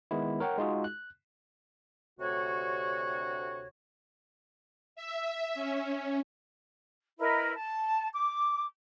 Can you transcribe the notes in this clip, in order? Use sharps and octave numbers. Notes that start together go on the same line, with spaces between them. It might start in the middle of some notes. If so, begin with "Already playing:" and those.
D#3 G#3 B3 E4
A#4 C#5 F#5 G5
G#3 D#4 F4 F#4 G#4
F#6
D2 C3 F#4 C#5
E5
C#4
E4 A#4 B4 D#5
A5
D6